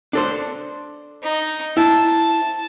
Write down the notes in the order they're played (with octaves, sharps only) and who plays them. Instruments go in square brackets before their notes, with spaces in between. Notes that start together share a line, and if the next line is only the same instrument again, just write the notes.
[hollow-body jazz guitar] D4 A4 C5
[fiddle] D#4
[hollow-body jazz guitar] E4 [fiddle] A5